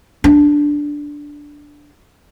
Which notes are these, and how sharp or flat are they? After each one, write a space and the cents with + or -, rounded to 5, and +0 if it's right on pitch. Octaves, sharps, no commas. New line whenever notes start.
D4 -5